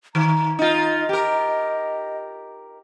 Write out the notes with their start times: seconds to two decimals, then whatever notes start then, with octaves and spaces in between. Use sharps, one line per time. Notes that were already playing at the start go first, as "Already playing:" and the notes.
0.15 D#3 A#5
0.59 D#4 F4 D#5
1.09 G4 A#4